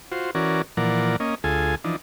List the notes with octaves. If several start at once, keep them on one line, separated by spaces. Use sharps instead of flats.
F4 F#4 C5
E3 C#4 F#4 A#4 D5
A#2 E3 F3 A#4 D5 F#5
A#3 C#4 D#5
D2 F4 G#4 A4 G#5
E3 F3 D4 D#4